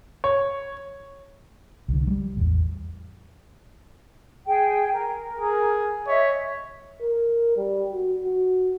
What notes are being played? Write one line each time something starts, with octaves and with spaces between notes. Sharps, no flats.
C#5
C2 D3
F#3 G3
A1 E2
G#4 G5
A#4
G#4
C#5 D#5 E5
A#4
G3
F#4
F#4